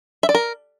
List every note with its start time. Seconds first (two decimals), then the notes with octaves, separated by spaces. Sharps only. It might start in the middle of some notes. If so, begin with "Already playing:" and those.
0.23 E5
0.29 D5
0.35 A#4